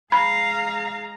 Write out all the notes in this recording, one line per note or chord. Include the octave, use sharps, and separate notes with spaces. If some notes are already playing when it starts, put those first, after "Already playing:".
G#3 F5 A#5 B5